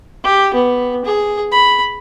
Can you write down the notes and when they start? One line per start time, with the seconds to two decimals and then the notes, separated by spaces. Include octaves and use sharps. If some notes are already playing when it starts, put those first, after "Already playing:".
0.24 G4
0.54 B3
1.05 G#4
1.52 B5